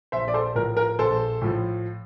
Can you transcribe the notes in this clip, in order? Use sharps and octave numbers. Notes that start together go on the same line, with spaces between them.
A#1 C5 E5
D5
A4 C5
A2 F3 A#4
A#4
A#1 A4 C5
A2 F3